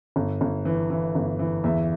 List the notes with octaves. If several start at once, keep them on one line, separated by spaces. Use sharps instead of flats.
G1
G1
E3
E3
G1
E3
E2 E5